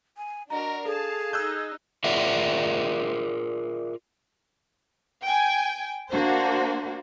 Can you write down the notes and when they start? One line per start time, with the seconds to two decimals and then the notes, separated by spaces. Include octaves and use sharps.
0.17 G#5
0.50 D4 F#4 A#4 D#5 A#5
0.85 G#4 A4 F5 A5
1.33 D#4 E6 F#6 G6
2.04 F4 G#4 A#4 D5 E5 F#5
5.23 G5 G#5
6.12 A#3 D4 F#4 C5